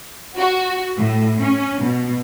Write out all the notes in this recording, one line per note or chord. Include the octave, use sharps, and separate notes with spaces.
F#4
A2
C#4
B2